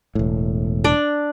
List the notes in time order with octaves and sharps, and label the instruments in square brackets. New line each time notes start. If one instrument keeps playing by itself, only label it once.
[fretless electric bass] E1 A2
[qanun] D4 D5